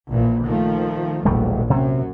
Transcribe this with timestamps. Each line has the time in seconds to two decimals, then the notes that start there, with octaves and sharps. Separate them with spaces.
0.12 A#1 A#2 E3
0.45 D#3 F3 A3
1.25 E1 A#1 D#2 G3 A3
1.70 F#2 C3 F#3